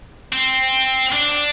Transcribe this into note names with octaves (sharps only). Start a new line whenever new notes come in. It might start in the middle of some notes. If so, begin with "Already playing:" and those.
C4
D4